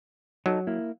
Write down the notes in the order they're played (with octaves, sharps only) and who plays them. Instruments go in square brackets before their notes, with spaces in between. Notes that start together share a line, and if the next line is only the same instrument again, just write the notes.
[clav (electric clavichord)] F#3 [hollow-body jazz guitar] D#4 A4
[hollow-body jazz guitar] A#3 E4